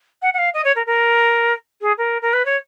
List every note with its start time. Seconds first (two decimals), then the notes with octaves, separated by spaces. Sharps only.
0.22 F#5
0.33 F#5
0.38 F5
0.54 D#5
0.64 C#5
0.75 A#4
0.86 A#4
1.81 G#4
1.98 A#4
2.22 A#4
2.33 B4
2.45 C#5